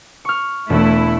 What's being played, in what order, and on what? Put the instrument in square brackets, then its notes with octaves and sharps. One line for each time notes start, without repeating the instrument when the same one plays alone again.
[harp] C#6 F6
[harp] E1 [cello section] A3 E4